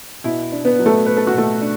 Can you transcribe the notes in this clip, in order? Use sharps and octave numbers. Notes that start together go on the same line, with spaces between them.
B2 E4
D4
B3 B4
F#3
A3 A4
B3 B4
A4
F#4
B2 A3 A4
D4